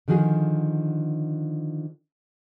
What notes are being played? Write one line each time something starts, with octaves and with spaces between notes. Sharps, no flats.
D3 D#3 F3 F#4 G#4